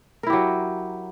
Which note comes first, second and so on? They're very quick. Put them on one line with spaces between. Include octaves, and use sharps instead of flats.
A#4 E4 G4 F#3